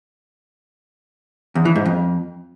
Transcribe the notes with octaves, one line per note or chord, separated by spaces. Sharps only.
E2
E3
G#2
F2